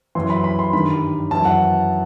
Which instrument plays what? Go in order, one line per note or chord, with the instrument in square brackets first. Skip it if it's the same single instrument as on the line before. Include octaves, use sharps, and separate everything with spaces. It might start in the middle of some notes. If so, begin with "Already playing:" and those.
[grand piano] F#2 E3 C6
B5
B5
C6
G2 D#3 B5
F#2 E3 A5
F#5